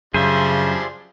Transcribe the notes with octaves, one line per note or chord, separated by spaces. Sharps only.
F#2 C#3 F3 G3 D4 G#4 C5 E5